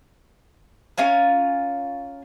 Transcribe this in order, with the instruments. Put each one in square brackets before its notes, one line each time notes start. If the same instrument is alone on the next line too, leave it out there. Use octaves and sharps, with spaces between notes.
[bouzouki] C#4 F4 G#5 A#5